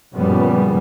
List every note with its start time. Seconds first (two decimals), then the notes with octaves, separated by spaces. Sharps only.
0.14 F#2 A#2 C#3 F3 G3 B3